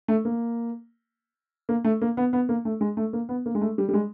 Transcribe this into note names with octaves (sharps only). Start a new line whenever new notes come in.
A3
A#3
A#3
A3
A#3
B3
B3
A#3
A3
G#3
A3
A#3
B3
A#3
G#3
A3
G3
G3
G#3